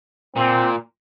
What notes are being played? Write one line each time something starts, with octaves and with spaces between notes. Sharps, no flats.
A#2 C4